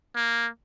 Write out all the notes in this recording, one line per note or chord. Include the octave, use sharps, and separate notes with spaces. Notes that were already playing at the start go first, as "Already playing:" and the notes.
A#3